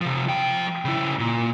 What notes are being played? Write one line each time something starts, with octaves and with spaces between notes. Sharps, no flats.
C3 F3
F3 G5
C#3 E4
A#2